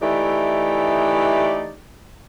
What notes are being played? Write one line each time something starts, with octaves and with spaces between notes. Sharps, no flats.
E3 A3 D#4 G4 D5